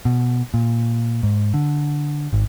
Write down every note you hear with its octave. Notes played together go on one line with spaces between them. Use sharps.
B2
A#2
G#2
D3
G#1